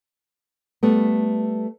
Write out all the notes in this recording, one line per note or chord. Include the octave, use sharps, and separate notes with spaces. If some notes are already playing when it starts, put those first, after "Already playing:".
G3 A3 B3